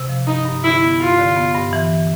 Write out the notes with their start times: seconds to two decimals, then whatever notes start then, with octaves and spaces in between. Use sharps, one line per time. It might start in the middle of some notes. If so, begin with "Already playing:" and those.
Already playing: C3
0.09 F3
0.27 G2 D#4
0.45 G2
0.64 D3 E4
0.82 B3
1.00 G2 F4
1.18 D3
1.37 B3
1.55 G2
1.73 E3